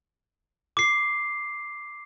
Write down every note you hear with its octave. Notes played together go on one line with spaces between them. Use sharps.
D6 C7